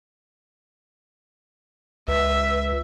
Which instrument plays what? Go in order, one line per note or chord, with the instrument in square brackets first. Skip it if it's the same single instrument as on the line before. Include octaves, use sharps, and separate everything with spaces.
[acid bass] C#2 [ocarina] B4 [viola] E5